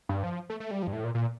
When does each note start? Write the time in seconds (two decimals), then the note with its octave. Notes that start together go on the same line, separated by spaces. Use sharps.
0.09 G2
0.24 F3
0.50 A3
0.60 A3
0.71 G3
0.83 F3
0.87 G2
0.93 A2
1.04 A#2
1.15 A#2